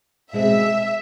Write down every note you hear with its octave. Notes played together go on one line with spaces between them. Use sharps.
B2 G#3 C4 G#4 E5